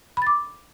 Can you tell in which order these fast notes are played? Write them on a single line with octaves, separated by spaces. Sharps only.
B5 A6 D6